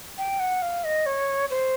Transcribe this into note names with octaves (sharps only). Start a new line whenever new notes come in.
G5
F#5
F5
D#5
C#5
C5